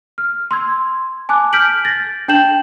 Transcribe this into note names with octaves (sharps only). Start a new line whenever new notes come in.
F6
C6 E6 G#6
G#5 A5 D6 F#6
F6 G6 B6 D7 F#7
A6 A#6
D4 G5 A5 G6 E7 F#7